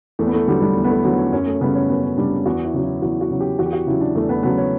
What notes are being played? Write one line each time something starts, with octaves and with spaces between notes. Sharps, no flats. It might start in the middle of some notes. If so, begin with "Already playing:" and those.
E2 A3
B3
A3
D3 F#3 G3
G3
E2
B3
A3
D3 F#3 B3
C#4
F#2 C#4
A3
C#3 G3 B3
C#4
F#2 B3
C#4
C#3 G3 D4
E2 F#4
E4
C#3 F#3
E4
E2 F#4
F#4
C#3 F#3
G4
E2 F#4
G4
F#4
C#3 F#3 E4
D4
E2 A3
B3
C#3 F#3 B3
C#4